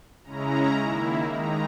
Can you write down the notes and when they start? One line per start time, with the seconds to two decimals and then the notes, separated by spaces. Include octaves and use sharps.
0.24 C#3 G#3 C#4 E4 A#5
0.78 D#3 A#3 E4
1.32 D#3 G#3 D#4 A#5